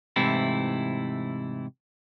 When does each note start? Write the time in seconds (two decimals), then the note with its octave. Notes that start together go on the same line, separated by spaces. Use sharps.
0.16 G#2 C3 E3 A3 E4